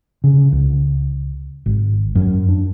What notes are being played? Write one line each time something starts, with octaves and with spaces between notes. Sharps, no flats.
C#3
C#2
G#1
F#2
D4